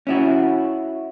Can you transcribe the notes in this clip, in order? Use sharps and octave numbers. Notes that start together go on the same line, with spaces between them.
C#4 E4 F#4